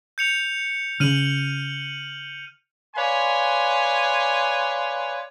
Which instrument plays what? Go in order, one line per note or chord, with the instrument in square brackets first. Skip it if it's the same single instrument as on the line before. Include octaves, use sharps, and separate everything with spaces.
[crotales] G6 C#7 F7
[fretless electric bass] C#3 C#4 [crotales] F6 D#7 F#7
[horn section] B4 C#5 D5 F5 G#5 C6